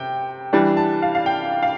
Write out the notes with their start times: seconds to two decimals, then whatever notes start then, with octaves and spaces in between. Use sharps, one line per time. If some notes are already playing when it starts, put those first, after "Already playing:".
Already playing: C3 G5
0.53 E3 G3 D4
0.77 A5
1.02 F5
1.15 F5
1.26 G5
1.63 F5